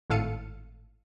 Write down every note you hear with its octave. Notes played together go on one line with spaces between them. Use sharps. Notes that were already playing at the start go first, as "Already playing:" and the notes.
G#1 A2 A4 F5 C#7 D#7